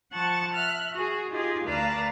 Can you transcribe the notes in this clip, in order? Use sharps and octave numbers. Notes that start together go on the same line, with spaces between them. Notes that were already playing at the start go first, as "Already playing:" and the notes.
F3 F#5 A5 C#6 A6
E5 F6 F#6
F#4 G#4
D#4 F4 G4 G#4
D2 B4 D5 F5 A5 A#5